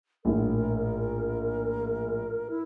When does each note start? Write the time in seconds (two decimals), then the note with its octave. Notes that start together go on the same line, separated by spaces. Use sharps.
0.25 A#1 A2 A#4
2.50 E4